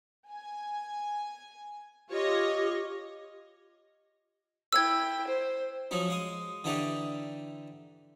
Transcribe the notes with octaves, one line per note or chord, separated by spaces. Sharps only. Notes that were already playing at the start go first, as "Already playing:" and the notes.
G#5
F4 G4 C#5 D#5
E4 G5 E6 G#6
C5
F3 F#3 C#4 D#4
G#3 F5 D#6
D3 E3 D4 D#4 G4